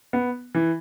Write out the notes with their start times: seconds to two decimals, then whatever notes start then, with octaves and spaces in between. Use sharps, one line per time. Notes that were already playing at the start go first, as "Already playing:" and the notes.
0.13 B3
0.55 E3